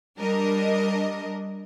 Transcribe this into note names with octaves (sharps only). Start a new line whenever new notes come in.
G3 D4 A#4 D#5